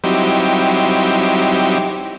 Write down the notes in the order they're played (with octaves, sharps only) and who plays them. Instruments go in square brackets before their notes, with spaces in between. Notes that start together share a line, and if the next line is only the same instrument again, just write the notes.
[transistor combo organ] F#3 G3 C4 D#4 E4 G4